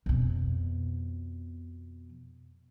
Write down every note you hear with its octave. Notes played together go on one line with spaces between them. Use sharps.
F2 B2